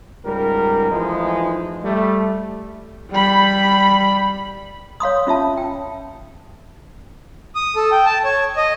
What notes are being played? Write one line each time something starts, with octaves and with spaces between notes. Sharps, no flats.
C#2 G#2 G3 A#4
E3 F3 G#3 A3 D#4
G3 A3
G3 B5
C#5 F5 C6 D#6
C#4 F4 E5 A5
G5
D#6
A4
G5
A5
C#5
D#5